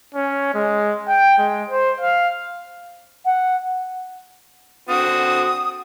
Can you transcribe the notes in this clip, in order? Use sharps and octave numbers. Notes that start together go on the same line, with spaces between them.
C#4
G#3
G5
G#3
C5
F5
F#5
D3 C4 F#4 D#6